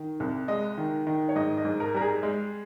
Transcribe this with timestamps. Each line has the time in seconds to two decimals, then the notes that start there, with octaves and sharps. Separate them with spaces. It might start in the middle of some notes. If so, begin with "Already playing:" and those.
Already playing: D#3
0.20 C2
0.48 G#3 D#5
0.78 D#3
1.07 D#3
1.29 C#5
1.35 G#2 D#5
1.57 D#5
1.65 G#2
1.80 A#4
1.94 G3 A#4
2.01 G#4
2.23 G#3